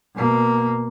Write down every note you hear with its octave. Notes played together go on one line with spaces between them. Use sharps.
B2 A#3